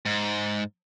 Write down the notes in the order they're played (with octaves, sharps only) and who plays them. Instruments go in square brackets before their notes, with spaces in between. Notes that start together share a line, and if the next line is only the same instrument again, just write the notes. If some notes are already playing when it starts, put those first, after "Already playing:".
[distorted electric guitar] G#2